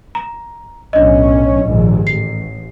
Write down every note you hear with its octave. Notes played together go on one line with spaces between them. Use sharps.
A#5
B1 A2 C#4 D4 D#5
A#1 D#2 G#2
A1 C7